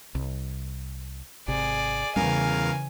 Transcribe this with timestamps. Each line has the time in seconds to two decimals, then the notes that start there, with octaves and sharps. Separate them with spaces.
0.15 C2
1.48 G#1 C3 G#4 D5
2.16 E2 C#3 E3 G3 C#4 A#4 F5 G#5